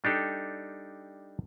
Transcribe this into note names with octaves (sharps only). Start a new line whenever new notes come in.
G3 D4 D#4 G4 A4